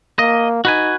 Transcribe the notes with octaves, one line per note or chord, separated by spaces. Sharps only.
A#3 D#5
D#4 F#4 B4 G#5